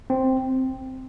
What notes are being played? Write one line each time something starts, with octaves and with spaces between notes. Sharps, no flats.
C4